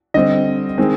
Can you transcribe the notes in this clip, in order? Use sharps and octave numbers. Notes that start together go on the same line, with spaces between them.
D3 G3 C4 D#5
D#3 G#3 C4